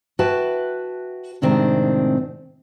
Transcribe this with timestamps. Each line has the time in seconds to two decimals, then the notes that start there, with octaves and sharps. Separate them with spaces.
0.19 F#4 B4 E5 G5 A5
1.42 A2 C3 D#3 G#3 C4 D4